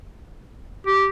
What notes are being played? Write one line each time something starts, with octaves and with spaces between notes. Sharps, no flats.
G4